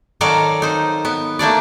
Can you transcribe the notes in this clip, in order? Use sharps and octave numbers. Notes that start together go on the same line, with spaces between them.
D#3 F#3 A4 D5 F5 A#5
D#4 C5
B3
A3 A#3 D4 D5